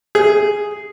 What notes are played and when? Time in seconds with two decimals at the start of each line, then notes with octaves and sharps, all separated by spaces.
0.15 G#4